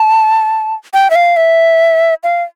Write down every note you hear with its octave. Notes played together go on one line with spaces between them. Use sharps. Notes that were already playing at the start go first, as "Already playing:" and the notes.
Already playing: A5
G5
E5
F5
E5
F5